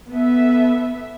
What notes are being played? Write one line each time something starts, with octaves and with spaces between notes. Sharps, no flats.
B3 A4 E5